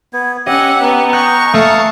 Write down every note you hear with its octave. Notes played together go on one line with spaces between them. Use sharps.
B3 G#6
C#4 G4 D#5 F#5 E6
B3 G#5 A#5
D#5 G5 C#6 F#6
A3 F5 A5 D#6